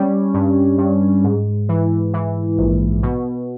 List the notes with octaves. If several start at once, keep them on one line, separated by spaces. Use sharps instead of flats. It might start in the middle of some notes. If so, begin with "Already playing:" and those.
Already playing: G3 C#4
G2
G2
G#2
E3
E3
A#1
B2